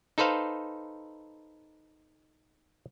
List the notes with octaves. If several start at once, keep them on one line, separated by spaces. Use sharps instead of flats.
D#4 A4 B4 C5 F5